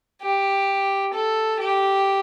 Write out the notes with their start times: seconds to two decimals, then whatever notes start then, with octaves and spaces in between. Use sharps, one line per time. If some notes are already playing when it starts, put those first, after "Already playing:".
0.22 G4
1.14 A4
1.59 G4